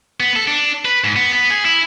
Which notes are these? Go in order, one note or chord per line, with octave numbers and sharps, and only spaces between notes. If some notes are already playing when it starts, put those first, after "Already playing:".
B3
A4
D4
B4
G#2
B3
B3
G#4
E4